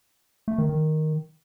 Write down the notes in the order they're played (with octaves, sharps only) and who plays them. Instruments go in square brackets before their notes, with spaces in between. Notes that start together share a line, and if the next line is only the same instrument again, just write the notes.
[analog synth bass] A3
D#3
D#3